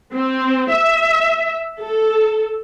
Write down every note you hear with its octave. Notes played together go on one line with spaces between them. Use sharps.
C4
E5
A4